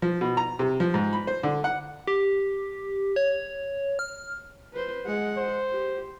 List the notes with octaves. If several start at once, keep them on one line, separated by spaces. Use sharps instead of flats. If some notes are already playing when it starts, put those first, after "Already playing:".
F3
B2
A#5
C3
F3
G#2
B5
C5
D3
F#5
G4
C#5
F6
B4 C5
G#3 F#5
C5
G4